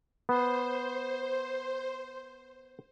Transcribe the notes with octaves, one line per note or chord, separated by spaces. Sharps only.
B3 C5